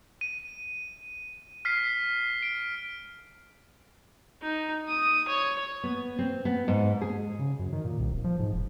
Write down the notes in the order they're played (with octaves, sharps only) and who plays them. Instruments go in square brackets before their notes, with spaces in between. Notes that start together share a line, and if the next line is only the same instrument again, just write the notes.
[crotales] D#7
F6 B6 C7
D7
[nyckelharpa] D#4
D#6
C#5
[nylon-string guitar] B3
C4
B3
G#2
G#4
[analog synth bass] C#3
F#2
D#3
A#2
C2
D1
F3
G#2
E1